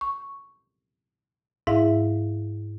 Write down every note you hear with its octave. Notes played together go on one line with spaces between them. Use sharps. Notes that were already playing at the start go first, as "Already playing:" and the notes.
C#6
G#2 E4 E5 F5